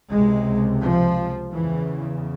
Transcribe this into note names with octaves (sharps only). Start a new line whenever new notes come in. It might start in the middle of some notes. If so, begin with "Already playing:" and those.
C#2 C3 G#3
F3
E2 C#3 E3